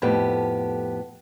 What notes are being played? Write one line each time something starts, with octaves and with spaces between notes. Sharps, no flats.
F2 A2 B3 G4